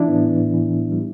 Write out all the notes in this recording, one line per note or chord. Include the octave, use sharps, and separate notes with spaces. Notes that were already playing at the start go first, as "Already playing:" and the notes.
Already playing: E3 D4 E4
A2 B3
E3
A2
E3
A2
E3
G3